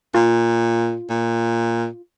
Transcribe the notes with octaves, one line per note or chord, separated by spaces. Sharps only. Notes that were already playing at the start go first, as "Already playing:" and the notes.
A#2 F4
A#2